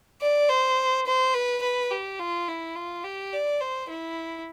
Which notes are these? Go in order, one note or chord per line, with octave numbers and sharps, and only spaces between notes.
D5
C5
C5
B4
B4
G4
F4
E4
F4
G4
D5
C5
E4